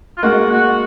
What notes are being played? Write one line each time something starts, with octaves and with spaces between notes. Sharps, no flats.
F4
G#3 A#3 F#4
F#4